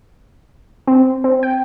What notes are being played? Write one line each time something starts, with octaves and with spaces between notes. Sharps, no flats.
C4
C4
G5